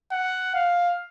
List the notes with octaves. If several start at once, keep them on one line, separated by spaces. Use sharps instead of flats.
F#5
F5